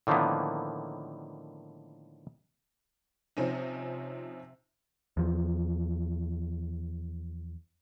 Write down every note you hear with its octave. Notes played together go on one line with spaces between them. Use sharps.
A2 D3 D#3 F3 A#3 B3
C3 F3 C4 C#4 D#4
E2 F3